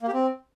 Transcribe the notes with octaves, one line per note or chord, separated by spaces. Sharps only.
A#3
G4
C4